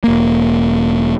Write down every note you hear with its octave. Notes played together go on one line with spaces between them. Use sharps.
E1 A#3